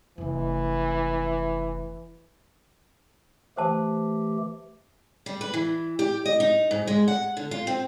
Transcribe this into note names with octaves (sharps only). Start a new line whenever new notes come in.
F1 E3 C4
E3 A3 G4 C5 A5
G3
B4
E3
G4
D#5
D#4
G#2
G#3
F#5
D3
F4
C4